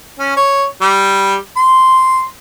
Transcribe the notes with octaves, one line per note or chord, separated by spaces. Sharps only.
C#4
C#5
G3
C6